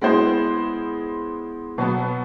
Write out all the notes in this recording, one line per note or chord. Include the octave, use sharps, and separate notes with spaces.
G#3 B3 E4 G#4 C5
B2 F#3 B3